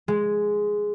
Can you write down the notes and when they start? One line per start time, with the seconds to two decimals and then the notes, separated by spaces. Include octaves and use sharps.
0.08 G#3